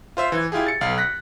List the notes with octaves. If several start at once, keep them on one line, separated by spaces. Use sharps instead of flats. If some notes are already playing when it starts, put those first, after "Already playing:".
F4 C5 E5
E3 G#6
E4 F4 G4 G#4
A6 C#7
B1 F5
F#6 A#6 B6